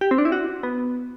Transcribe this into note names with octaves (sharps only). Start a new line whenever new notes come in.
G4
C4
D4
E4
F#4
B3